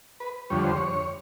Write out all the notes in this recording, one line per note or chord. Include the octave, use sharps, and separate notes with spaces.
B4
F2 D3 G3 C#5
C5
C#5